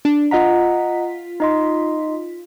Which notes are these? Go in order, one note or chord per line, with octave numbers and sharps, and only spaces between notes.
D4
F4 D#5 F#5 A#5 B6
D#4 D#5 C6